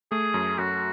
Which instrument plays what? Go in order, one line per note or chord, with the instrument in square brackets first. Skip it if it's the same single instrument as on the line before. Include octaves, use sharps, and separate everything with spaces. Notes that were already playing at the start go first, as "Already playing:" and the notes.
[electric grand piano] A3 [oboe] G#4
[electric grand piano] F#2
[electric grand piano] F#2 [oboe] F#4